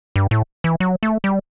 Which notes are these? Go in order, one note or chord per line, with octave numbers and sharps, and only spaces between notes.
G2
A2
E3
F#3
A3
G3